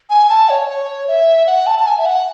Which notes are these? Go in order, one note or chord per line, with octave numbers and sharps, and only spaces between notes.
G#5
A5
C#5
C#5
E5
F#5
A5
A5
G#5
E5
F#5